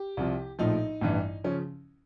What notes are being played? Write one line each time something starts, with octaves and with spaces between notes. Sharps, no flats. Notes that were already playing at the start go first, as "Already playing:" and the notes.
Already playing: G4
C2 C3 F3
A#1 A2 F3 D#4
A1 G2 E3
C#3 F3 C#4